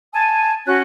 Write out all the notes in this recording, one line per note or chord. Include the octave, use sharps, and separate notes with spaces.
G#5 A5
C#4 F#4 F#6